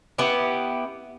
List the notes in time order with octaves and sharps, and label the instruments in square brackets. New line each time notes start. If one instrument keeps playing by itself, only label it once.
[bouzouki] B3 E4 G4